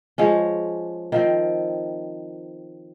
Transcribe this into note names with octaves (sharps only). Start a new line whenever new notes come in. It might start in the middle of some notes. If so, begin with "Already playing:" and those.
F3 G#3 C#4
D#3 F3 C4